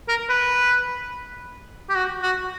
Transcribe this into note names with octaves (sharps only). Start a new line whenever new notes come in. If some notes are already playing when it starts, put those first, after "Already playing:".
A#4
B4
G4
F#4
F#4